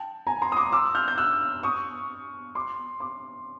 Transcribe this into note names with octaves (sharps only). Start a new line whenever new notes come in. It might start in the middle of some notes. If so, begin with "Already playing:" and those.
Already playing: G5 A5
G#5 A#5
A#5 C6
D#6
C6 D6
D6 E6
F6 G6
G6
E6 F#6
C#6 D#6
C6 D6
C6 D6